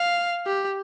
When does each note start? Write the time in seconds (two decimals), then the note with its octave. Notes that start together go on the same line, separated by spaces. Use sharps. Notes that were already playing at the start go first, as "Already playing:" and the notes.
Already playing: F5
0.46 G4